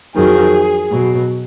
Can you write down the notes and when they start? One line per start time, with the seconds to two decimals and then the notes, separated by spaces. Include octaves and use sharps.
0.15 F2 D#3 F#3 G#4
0.90 B2 F#3